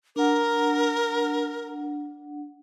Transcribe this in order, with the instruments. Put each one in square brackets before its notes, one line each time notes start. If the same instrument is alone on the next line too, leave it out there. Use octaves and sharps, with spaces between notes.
[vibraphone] D4 F#5 [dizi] A#4